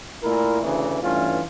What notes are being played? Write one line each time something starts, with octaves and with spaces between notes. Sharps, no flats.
A#2 A3 E4 A#4
D2 C#3 E3
G2 E3 A3 C#4 F4